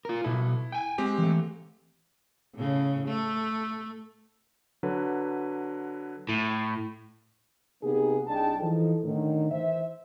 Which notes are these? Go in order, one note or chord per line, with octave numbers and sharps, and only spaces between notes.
F4 A#4
B2 E4 A4
G5 G#5
G#3 C4 G4
E3 A3
A2 C#3
A3
D3 F#3 B4
A2
C3 A#3 B3 D#4 G4 G#4
C2 D4 D#4 G#4 G5 A5
E3 F3 D#4 A4
A2 D3 D#3
E3 C5 E5